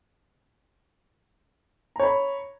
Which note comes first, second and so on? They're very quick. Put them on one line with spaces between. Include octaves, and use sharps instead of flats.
A#5 C#5 B5